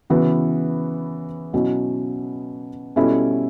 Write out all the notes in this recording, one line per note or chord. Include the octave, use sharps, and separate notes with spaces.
C#3 E3 B3 F#4 B4
B2 F#3 C#4 E4
B2 G3 C#4 E4 A4